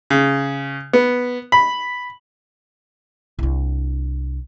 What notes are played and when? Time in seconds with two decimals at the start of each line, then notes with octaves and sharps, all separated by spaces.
0.10 C#3
0.93 B3
1.52 B5
3.39 C2 D4